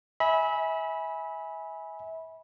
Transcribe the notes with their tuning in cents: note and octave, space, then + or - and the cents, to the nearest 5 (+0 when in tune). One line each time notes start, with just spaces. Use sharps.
E5 -30 G#5 +0 B5 -15